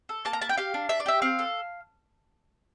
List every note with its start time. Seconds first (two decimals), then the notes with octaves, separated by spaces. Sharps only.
0.09 A4
0.25 A#3 A5
0.33 A#5
0.41 E4 A5
0.49 G5
0.57 G4 F5
0.74 D4
0.89 D4 E5
1.00 D5
1.06 G4 E5
1.22 C4 F5
1.39 A4